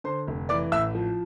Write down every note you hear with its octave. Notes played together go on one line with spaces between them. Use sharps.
D3 C5 C6
F1
E3 D5 D6
A1 E5 E6
F3